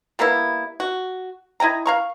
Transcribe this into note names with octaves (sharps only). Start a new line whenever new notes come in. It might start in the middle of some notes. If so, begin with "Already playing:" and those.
G3 A#3 B3 E4
F#4
E4 D#5 G5 A#5
F5 A#5 C#6